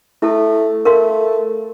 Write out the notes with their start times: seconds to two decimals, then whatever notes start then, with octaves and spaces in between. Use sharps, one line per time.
0.22 A3 E4 A4
0.85 A3 A#4 F5 C6